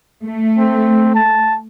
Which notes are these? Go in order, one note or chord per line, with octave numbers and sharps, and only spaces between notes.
A3
C4
A5